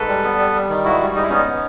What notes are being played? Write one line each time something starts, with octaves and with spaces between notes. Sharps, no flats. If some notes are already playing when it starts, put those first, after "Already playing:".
Already playing: G#2 A4 B4
G3
B3
G3
G3
D#3
G#2 E4 F#4
G3
G#2 D#4
E4
B3 C#4 D#4
B3